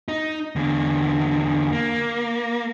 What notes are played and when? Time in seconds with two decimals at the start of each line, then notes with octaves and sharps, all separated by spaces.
0.08 D#4
0.56 E2 D3
1.72 A#3